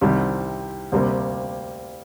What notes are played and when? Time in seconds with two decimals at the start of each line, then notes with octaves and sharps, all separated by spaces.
0.01 C2 C3 D#3 G3
0.92 D2 C3 G3 A#3